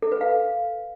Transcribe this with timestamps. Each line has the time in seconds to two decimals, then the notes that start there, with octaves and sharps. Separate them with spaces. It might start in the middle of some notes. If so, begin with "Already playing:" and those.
0.02 A4
0.12 B4
0.21 F5